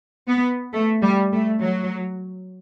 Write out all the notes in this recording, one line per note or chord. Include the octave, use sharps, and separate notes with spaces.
B3
A3
G3
A3
F#3